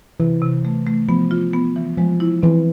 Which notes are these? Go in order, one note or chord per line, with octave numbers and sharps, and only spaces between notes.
C3 E3
C3
A3
A3
F3 B3
F4
B3
E3
F3 G#3
E4
E3 C4